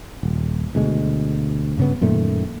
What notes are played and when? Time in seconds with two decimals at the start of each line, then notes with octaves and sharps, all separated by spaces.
0.23 D#1
0.75 D2 B2 G#3
1.77 G2 C#3 B3
2.01 F#2 A#2 D#3 A3